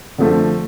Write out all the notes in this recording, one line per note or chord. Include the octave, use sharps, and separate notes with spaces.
D3 F3 A3